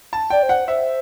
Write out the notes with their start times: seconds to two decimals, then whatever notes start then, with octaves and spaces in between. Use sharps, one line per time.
0.13 A5
0.30 D5 G5
0.43 C5
0.49 F#5
0.68 C5 E5